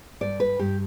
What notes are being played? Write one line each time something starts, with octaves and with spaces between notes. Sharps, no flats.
G2 D5
B4
G2 G4